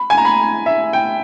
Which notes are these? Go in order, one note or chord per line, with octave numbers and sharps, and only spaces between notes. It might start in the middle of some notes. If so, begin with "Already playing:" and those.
Already playing: B5
G#5
A#5
B5
E5
G5